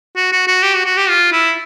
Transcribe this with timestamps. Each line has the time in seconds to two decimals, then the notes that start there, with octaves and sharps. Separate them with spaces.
0.16 F#4
0.32 F#4
0.47 F#4
0.63 G4
0.74 F#4
0.86 F#4
0.97 G4
1.09 F4
1.32 E4